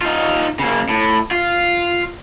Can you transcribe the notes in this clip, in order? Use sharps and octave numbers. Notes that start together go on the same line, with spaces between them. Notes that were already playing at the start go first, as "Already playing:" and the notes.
D#4 F4
C#3 A#3
A2
F4